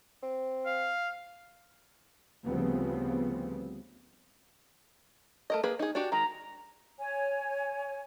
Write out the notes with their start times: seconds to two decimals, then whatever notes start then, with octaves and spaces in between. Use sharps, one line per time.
0.23 C4
0.67 F5
2.46 D2 C#3 F3 G3 B3 C4
5.50 A3 A#4 D#5
5.63 A#3 G#4 B4
5.79 D#4 G#4
5.95 D4 F#4 G4
6.12 D#3 G#3 A#5
6.98 C#5 G#5